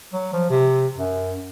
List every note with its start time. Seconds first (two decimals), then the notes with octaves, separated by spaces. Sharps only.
0.13 F#3
0.33 F3
0.50 C3
0.97 F#2